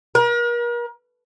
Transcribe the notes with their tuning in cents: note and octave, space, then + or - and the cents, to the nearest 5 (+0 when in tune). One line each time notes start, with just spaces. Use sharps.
A#4 +40